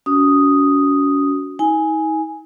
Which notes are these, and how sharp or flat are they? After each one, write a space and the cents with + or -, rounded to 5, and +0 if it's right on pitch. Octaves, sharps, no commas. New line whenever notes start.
C#4 +35 F#4 +0 D#6 +0
D#4 +40 G#5 +0